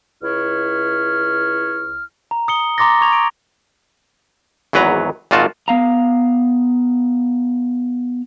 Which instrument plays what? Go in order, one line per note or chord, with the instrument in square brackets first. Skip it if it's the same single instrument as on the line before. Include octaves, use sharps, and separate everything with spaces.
[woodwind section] C#2 E4 C#5 F6
[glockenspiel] A#5
D#6 C#7 G7
A#5 C6 D6 A6 A#6
C#6 G#6 F7
D7
[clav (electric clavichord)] G#1 E2 F#3 B4 A#5
G#1 A#2 F4 F#4 A5
[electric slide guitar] B3 F5 A#5